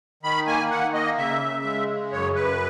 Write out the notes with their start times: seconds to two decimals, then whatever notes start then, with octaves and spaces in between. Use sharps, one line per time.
0.23 D#3 B5
0.47 A#3 G#5
0.71 D#3 F#5
0.94 A#3 D#5
1.18 C#3 E5
1.41 C#3
1.64 G#3
1.89 C#3
2.12 F#2 C#5
2.35 F#2 B4